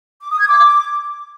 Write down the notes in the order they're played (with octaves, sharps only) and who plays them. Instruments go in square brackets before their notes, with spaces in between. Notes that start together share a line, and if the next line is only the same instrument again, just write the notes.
[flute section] D6
D#6
G#6
D6